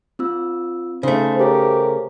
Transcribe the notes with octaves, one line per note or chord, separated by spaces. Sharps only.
C4 F4 E6
C#3 A3 D#4 C5
G4 G#4 A#4 C5 C#5